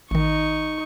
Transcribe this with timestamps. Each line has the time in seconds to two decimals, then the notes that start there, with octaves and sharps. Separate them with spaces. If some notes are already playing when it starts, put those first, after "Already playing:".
0.11 A1 D#3 D#4 C#6